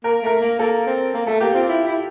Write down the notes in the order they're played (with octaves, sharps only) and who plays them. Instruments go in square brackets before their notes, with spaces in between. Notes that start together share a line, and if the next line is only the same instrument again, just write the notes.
[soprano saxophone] A#3 [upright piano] A#4
[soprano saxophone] A3 [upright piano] A#4
[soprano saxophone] A#3
[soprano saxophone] A#3 [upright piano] A4
[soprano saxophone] C4
A#3
[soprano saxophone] A3 [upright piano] A4
[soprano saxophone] A#3 [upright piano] G4
[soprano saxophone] C4 [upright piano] F4
[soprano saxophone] E4
E4